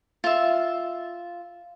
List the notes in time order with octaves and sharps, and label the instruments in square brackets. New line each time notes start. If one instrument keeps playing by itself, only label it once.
[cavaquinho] F4 E5